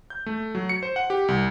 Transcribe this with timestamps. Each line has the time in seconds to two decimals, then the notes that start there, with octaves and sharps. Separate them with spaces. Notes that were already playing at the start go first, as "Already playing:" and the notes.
0.10 G6
0.26 A3
0.55 F#3
0.69 C#7
0.83 C5
0.96 F#5
1.10 G4
1.28 C2